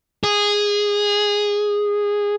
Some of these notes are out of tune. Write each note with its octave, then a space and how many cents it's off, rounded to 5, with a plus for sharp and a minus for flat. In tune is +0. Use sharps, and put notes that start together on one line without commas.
G#4 -10